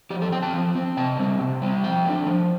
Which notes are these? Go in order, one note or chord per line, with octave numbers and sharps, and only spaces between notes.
F3 G4
A4
C4 G5
A5
F3
C4
C3 A5
G3 C4
C3
G3 C4
F3 G5
A3 D4
F3